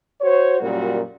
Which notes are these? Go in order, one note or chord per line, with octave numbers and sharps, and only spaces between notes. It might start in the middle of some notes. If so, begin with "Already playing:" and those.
F#4 C5 C#5
F#2 A#2 G3 F#4 A#4